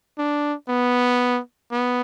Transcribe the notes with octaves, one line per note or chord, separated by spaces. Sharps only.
D4
B3
B3